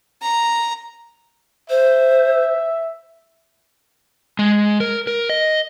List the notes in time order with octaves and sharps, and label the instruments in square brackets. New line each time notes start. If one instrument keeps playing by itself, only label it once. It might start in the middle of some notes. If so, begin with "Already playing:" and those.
[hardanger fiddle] A#5
[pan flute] C5 [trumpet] E5
[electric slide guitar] G#3
A#4
A#4
D#5